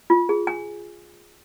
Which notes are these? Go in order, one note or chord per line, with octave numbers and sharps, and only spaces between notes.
F4
G#4
G#5